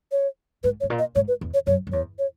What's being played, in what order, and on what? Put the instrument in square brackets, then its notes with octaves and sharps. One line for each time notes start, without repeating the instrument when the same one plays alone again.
[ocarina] C#5
[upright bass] G#2 [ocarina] B4
[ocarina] C#5
[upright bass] G#2
A#2
[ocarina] D#5
[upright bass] G#2 [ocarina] C#5
[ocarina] B4
[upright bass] E2
[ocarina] C#5
[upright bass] F#2 [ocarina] C#5
[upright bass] F#2
[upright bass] E2 [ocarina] C#5
[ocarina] C#5